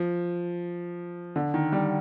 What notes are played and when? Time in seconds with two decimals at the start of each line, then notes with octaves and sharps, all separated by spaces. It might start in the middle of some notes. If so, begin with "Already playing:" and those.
Already playing: F3
1.36 D3
1.54 D#3
1.72 G3